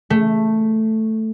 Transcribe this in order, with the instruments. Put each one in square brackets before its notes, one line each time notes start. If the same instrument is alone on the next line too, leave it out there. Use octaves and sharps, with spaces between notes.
[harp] A3